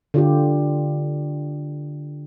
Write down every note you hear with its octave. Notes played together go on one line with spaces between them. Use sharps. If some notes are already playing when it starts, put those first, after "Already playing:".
D3 F4 G4